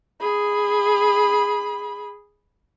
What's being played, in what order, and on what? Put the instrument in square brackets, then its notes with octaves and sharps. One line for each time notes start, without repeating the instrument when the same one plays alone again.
[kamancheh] G#4 B5